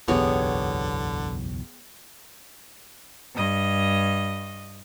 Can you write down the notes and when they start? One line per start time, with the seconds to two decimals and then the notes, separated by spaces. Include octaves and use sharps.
0.08 F#1 B1 E2 D3 B3 G4 G#4 C#5
3.35 G2 D#5